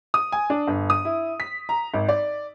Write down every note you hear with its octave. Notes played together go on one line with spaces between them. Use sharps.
D#6
G#5
D4
G1
D#6
E4
B6
A#5
G#1
D5